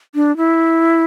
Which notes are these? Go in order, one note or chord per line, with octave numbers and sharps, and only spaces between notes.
D4
E4